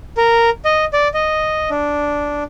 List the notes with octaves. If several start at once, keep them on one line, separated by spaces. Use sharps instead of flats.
A#4
D#5
D5
D#5
D4